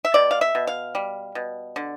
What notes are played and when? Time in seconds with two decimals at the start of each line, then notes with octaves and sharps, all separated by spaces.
0.05 E5
0.14 B2 D5
0.31 F5
0.41 E5
0.55 B2
0.67 F5
0.95 G3
1.35 B2
1.76 D3